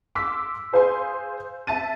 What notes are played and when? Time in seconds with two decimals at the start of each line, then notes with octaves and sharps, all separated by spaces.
0.15 C6 D6 E6 F6 B6
0.73 G#4 C5 F5 G#5 C6
1.67 E5 A5 A6 D#7